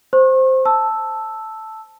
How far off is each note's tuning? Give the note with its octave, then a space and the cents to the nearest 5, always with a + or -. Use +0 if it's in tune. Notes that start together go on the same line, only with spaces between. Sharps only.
C5 +0 C#6 -40
A5 +0 E6 +0